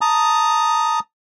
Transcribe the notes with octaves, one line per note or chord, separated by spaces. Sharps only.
A5 A#5 D#6